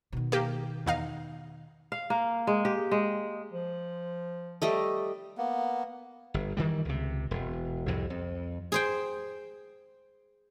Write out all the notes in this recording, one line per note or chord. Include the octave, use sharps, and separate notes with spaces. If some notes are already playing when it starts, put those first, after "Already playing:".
B2 D#3
A#3 G4
E2 D#4 F5
F5
A#3
G#3
G4
G#3
F3
G3 A3 D#5
A#3 B3
G1
D#3 E3 G3
C#2 C3
E1
C2 F2 A2
F2
G#4 C5 G5